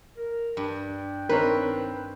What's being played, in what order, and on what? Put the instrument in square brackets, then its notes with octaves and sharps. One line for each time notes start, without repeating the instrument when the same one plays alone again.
[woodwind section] A#4
[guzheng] G2 [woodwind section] D4 G5
[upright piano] D#3 C4 C#5 [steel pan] A#4 [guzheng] B4